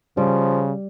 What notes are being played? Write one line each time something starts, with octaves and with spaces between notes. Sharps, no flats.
C#3 F3 G3